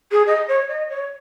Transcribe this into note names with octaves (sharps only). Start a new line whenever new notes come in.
G#4
D#5
C#5
D#5
C#5